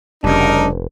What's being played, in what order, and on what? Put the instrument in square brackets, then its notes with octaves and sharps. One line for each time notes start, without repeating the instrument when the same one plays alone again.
[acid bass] F1 [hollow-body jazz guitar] G2 C#3 [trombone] D4 [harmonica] D#4 A#4